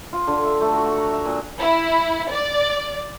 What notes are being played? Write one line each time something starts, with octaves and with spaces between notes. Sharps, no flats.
F4
D3
E5
A3
F#4
F#5
A#5
E5
A#2
E4
D5